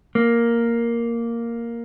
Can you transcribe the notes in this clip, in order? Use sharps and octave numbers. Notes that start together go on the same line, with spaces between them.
A#3